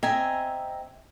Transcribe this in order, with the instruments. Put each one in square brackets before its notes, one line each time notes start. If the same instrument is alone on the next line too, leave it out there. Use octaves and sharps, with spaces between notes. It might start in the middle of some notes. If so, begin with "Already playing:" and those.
[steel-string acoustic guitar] C4 D#5 A#5 [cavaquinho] E5 G#5